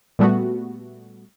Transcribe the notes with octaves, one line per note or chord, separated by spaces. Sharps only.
A#2 G3 A3 B3 F#4